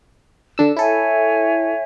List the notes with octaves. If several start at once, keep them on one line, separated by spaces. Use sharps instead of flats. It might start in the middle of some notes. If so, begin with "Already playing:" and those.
D3 D4 E6
E4 A4 C#5 E5 G#5